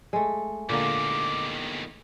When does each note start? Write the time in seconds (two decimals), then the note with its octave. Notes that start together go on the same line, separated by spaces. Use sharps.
0.13 G#3 A3
0.69 E2 A#2 D3 D#3 A#3 D6